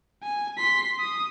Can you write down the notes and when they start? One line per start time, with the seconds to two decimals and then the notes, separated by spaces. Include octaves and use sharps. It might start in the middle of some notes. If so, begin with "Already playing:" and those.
0.23 G#5
0.57 C6 B6
0.99 D#6